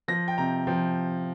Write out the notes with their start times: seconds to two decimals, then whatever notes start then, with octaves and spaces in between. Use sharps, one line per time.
0.08 F3 A#6
0.28 G5
0.38 C3 A#5
0.67 F3 G5